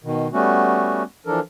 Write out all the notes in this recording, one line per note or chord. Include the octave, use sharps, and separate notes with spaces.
B2 D#3
G3 A3 B3 C#4 F#4
E3 F3 D4 A4 A#4